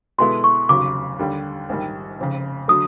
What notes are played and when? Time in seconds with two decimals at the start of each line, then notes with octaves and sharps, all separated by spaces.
0.18 B2 G#3 B3 E4 A4 C6
0.44 C#6
0.69 F1 D#2 C#3 F#3 D6
1.19 D#2 D3 G3
1.69 A#1 G#2 D#3 G3
2.19 F1 F2 C#3
2.68 D3 F#3 A3 D#6